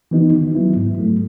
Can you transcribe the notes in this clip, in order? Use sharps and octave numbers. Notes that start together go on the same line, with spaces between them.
E3 B3 D#4 F#4
D#3
F#3 B3 E4
G#2
F#3 A3